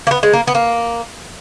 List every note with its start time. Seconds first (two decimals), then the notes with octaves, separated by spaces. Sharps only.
0.07 A#3
0.11 B3
0.23 G#3
0.33 A#3
0.47 B3
0.55 A#3